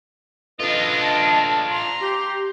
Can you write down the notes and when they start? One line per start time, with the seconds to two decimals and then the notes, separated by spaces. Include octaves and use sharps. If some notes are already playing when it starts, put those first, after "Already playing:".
0.59 D4 F4 A4 B4 D#5
1.02 A5
1.69 A#5 C6
2.01 G4